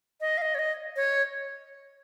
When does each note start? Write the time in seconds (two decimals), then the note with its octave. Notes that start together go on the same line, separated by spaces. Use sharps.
0.21 D#5
0.38 F5
0.42 D#5
0.55 C#5
0.59 D#5
0.96 C#5